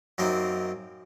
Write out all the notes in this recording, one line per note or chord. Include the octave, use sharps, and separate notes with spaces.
F#2 A#3 C4 D#4